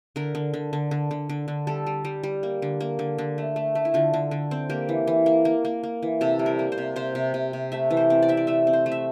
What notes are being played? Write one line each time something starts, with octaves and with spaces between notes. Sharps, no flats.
D3 A#4
D3
D3
D3
D3
D3
D3
D3
G3 A4
G3
G3
G3
A#3
D3
A#3
D3
D3
A3
A3
A3
E4
D3 F4
D3
D3
C4
A#3 G4
E3
E3
A#3
A#3
A#3
A#3
E3
C3 A4
G3
A#4
A#3
C5
C3
C3 C5
C3
C3
C3
A3 E5
E3
C5
C4
D5
C4 E5
D5
A3 E5
C4
C5
A3
E5